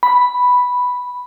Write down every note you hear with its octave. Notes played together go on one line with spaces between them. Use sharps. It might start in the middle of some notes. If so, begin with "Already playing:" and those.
B5